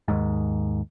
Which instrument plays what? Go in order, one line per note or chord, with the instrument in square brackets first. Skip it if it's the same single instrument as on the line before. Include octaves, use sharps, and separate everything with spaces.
[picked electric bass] D#2 G#2